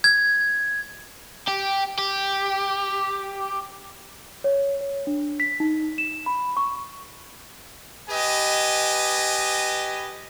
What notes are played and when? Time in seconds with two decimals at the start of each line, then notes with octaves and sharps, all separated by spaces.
0.04 G#6
1.48 G4
1.99 G4
4.44 C#5
4.81 C#5
5.07 D4
5.40 B6
5.60 D#4
5.98 E7
6.26 B5
6.57 C#6
8.10 G4 B4 D#5 G#5